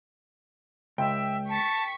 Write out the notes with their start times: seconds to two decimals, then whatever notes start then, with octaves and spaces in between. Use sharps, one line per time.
0.98 C#2 E5 G5
1.49 A5 C#6 B6